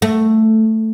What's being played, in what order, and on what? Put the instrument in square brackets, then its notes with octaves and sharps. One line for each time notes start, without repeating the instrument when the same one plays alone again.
[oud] A3